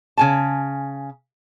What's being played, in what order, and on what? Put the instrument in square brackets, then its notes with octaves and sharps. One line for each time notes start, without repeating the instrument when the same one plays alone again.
[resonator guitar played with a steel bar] C#3 G#5 A5